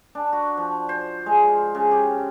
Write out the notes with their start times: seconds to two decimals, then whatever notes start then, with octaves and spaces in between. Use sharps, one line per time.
0.15 D4
0.33 F#4
0.57 F3
0.89 C5
1.26 G#3
1.48 F4
1.75 C#3
1.91 G4